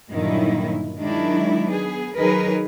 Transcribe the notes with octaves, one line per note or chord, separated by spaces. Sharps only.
G2 A#2 D3 D#3 F#3 E4
D#3 F#3 G#3 D4 E4
B3 G#4
D#3 F#3 D#4 G#4 A#4 B4